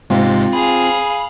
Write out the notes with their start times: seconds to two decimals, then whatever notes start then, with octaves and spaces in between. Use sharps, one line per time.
0.10 G#2 C3 G#3 C4 F4
0.53 G#4 F5 B5